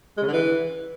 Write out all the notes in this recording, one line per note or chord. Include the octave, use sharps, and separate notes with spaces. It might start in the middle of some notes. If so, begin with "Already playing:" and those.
G#3
C#3
D3
E3